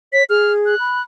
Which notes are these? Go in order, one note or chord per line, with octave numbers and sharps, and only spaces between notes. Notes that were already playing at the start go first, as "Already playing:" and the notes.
C#5 B6
G#4 F6
F#6
B5